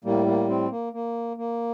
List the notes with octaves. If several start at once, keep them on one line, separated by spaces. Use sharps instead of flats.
A2 G3 A#3
A#3
C4
A#3
A#3
A#3